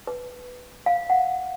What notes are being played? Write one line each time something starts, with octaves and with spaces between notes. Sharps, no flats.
B4
F5
F#5